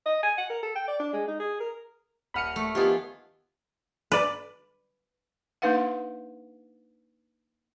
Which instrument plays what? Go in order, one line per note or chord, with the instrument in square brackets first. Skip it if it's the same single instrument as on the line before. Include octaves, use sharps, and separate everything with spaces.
[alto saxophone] D#5
G#5
F#5
A#4
A4
G5
D5
D4
G#3
D#4
G#4
A#4
[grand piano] D#1 F#5 D#7 [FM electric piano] B5 F6 C#7
[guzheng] A3
[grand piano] D#3 F3 B3 [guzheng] F4 G#4 [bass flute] G4
[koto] B4 D5
[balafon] A#3 D4 D#4 B4 F5 F#5